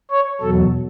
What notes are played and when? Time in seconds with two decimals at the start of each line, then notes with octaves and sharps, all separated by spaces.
0.11 C#5
0.41 E2 B2 F#3 A4